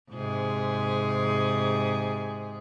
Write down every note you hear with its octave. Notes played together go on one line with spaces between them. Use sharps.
G#2 C3 G#4